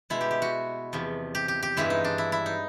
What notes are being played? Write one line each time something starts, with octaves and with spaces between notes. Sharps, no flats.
B2 G#3 E4
G4
G4
F#4
E2 C3 F3
G4
G4
G4
G2 E3 G#3 E4
D#4
D4
E4
E4
D#4